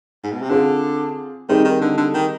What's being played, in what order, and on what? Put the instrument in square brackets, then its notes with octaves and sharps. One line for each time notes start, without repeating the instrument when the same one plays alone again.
[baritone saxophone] G#2
B2
C3
[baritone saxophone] D3 [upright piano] C4 F4 G#4
[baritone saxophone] D#3 [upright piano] G3 C4 D#4 G#4
[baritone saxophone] D#3
D3
D3
D#3